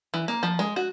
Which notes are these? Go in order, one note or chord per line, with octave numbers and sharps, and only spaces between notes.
E3
A#3
F3
G#3
F#4